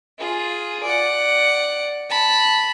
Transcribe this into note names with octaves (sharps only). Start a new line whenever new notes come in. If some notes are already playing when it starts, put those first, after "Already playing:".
F4 G#4
D5 F#5
A5 B5